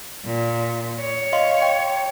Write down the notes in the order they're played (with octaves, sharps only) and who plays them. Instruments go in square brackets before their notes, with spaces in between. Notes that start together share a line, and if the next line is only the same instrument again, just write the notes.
[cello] A#2
C#5
[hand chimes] D#5 F5 C6
G5